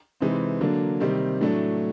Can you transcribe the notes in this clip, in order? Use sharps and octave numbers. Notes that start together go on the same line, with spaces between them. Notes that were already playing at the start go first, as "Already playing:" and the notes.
C3 E3 G#3 C4 D#4
D3 F#3 A#3 D4
C3 D#3 G3 C4
A2 F#3 A3 D4